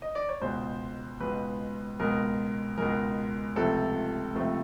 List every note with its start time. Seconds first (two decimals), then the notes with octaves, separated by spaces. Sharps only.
0.02 D#5
0.15 D5
0.29 C#5
0.41 C#2 B2 G#3 C5
1.20 C#2 B2 G#3 B4
1.99 C#2 B2 G#3 A#4
2.78 C#2 B2 G#3 A#4
3.56 C#2 C3 F3 A3 C4 A4
4.35 C#2 C3 F3 A3 C4